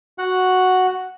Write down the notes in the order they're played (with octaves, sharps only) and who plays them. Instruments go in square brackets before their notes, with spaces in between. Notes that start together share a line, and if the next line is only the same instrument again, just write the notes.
[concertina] F#4 F#5